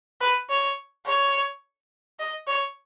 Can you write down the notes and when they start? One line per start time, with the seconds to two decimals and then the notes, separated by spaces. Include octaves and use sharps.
0.21 B4
0.50 C#5
1.06 C#5
2.19 D#5
2.47 C#5